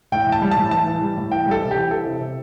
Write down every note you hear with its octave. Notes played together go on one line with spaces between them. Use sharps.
A2 G5
A2
A5
G3
A5
A2
E3 A5
E3
G3
A2
E3 G5
G3
A4
C3
G4
E3
E3 A4
C3
C3